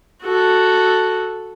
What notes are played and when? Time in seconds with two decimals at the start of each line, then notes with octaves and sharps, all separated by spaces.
0.23 F#4 A4